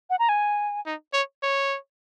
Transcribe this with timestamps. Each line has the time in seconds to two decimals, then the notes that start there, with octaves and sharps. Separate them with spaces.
0.10 F#5
0.19 A#5
0.29 G#5
0.86 D#4
1.14 C#5
1.43 C#5